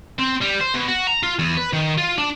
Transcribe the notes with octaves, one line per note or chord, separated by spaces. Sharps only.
C4
G3
C5
B2
F#4
A#5
F4
E2
B4
D#3
F4
D4